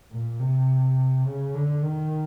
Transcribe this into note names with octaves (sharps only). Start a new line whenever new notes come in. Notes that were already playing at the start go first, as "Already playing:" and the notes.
A#2
C3
C#3
D3
D#3